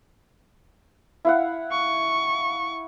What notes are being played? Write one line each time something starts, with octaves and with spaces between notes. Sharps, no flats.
E4 F5 F#5
C#6